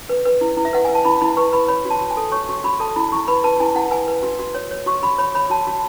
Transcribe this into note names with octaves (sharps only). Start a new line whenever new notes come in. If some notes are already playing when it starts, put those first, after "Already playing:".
B4
B4
E4
E4
E5
B4 F#5
B4 G#5
A5
E4 B5
E4 B5
B4 C#6
B4 B5
C#5 B5
F#4
A5
F#4
G#5
A4
C#5 C#6
F#4 C#6
F#4 B5
A4 A5
E4 B5
E4 C#6
B4 B5
B4 A5
E4 G#5
E4 F#5
B4 G#5
B4
F#4
F#4
C#5
C#5
F#4 C#6
F#4 B5
C#5 B5
C#5 B5
F#4 A5
F#4